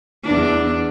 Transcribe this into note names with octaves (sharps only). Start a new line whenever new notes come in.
E2 D4